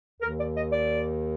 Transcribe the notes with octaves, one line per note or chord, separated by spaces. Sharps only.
D#2 D#3 A#4
D5
D#5
D5